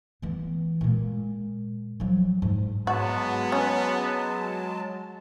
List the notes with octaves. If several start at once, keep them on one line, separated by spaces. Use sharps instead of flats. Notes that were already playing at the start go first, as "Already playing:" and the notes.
E3 B3
A#2 G#3
F3 F#3
G#2
F#3 G#3 B3 F#4 A5
C#4